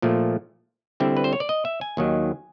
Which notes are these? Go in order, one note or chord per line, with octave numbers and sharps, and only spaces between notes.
A#2 F3 A3
D3 G3 C4 E4
B4
C5
C#5
D5
D#5
E5
G#5
D#2 D#3 F#3